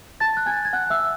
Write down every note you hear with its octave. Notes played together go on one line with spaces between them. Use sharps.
A5 A6
F#6
G#5 G#6
G#6
F#5 F#6
E5 E6